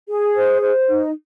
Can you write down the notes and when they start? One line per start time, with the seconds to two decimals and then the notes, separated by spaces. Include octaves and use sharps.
0.08 G#4
0.35 C5
0.61 C5
0.89 D#4